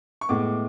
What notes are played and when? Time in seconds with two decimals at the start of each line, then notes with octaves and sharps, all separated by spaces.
0.21 C#6
0.29 A2 G#3 B3 D6